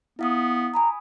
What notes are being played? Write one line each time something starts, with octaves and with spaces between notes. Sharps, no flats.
B3 E4 F5 D#6
G#5 A#5 B5 D#6